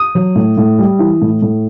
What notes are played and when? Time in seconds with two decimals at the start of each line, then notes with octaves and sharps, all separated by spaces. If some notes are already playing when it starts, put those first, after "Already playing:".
Already playing: D#6
0.15 F#3
0.35 A2
0.57 A2
0.78 G3
0.99 E3
1.21 A2
1.42 A2